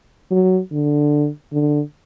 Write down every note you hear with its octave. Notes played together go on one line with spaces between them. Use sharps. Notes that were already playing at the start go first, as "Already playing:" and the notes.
F#3
D3
D3